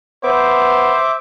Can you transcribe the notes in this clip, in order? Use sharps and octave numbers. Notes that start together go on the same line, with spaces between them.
B3 C5 E5 D6